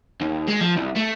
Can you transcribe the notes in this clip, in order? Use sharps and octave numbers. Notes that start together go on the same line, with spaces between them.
D#2
G#3
F3
C2
A3